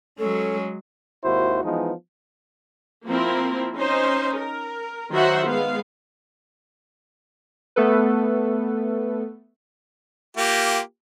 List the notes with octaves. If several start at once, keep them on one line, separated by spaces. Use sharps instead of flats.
F#3 G#3 C#4 A4
G#1 D#2 E4 F#4 C5
E3 F3 G#3 B3 D#4
F3 A#3 C4 E4 A#4
C#4 D#4 C5
A#4
D#3 F#3 F#4 C5 E5 F#5
G#3 B3 F5
A3 B3 A4 B4
A#3 F4 G4